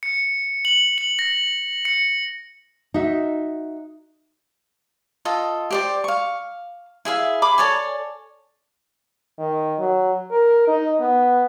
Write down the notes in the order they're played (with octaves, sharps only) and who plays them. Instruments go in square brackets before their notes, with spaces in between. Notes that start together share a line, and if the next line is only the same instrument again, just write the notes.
[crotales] C#7
F#7
F#7
A#6
C#7
[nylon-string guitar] D#4 F#4 E5
[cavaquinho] F4 A4 D#5
G4 C5 D5
F5 C#6
E4 G#4 E5 F5
G#4 B5 D6
A4 C#5 D5 G#5
[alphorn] D#3
F#3
A#4
D#4
B3